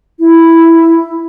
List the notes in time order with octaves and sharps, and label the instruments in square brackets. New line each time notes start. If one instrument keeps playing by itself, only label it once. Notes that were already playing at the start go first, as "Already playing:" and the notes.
[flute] E4